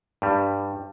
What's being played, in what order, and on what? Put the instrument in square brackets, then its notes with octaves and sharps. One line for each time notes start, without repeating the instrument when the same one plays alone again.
[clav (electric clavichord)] G2 G3